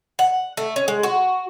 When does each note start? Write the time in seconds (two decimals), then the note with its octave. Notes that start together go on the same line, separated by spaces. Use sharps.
0.19 F#5
0.57 A3
0.76 C#4
0.88 G#3
1.03 F#4